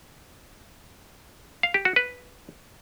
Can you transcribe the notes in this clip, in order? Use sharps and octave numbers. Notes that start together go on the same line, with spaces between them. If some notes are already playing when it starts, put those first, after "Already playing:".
F5
G4
F#4
B4